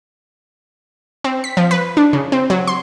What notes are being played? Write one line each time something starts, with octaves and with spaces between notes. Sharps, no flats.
C4
B6
F3
B4
D4
C#3
C4
F#3
C6